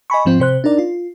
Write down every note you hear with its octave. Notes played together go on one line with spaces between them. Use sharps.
D#5 G#5 B5 C#6
G#2 F3 C4 F4
C3 C5 F#6
D4 D#4 A#4 D5
F4